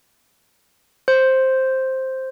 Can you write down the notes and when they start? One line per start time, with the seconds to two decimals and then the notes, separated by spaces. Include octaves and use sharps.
1.08 C5